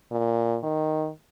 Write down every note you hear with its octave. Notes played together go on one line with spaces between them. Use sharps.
A#2
D#3